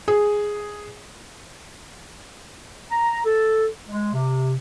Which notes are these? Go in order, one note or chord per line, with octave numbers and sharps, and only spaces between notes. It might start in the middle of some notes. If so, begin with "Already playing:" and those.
G#4
A#5
A4
G#3
C3